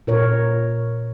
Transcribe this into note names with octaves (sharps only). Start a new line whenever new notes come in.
A#2 A#4 C#5